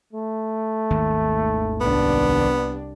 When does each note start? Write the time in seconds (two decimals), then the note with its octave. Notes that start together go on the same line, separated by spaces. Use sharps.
0.13 A3
0.90 G#1 D#2
1.80 C2 B3 D4